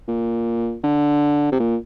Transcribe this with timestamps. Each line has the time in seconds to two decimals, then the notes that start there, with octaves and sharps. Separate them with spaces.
0.08 A#2
0.83 D3
1.52 C3
1.59 A#2